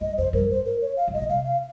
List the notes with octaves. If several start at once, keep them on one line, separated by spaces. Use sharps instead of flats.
G2 D#5
F2 C5
G2 A#4
G#2 C5
A#4
C#5
F5
G2
G#2 D#5
A#2
C3 F5
F5